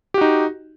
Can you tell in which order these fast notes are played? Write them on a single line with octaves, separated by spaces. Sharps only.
G4 F#4 D#4